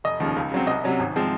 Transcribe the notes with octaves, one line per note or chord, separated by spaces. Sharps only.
F1 D#5
D#2 C#3 F3
C#2
C#3 F#3 C4
C2 D#5
C3 F#3 C#4
G#1
F3 G#3 C4